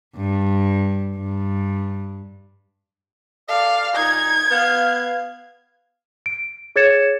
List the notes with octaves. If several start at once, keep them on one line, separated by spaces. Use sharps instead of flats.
G2
G2
A4 D5 F5
A#2 D#4 G#6
B3 F5
D7
G#4 C#5 G#6 A6 C#7 E7